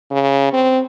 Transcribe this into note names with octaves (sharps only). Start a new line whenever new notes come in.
C#3
C4